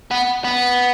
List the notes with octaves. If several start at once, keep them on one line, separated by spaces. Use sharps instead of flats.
B3
B3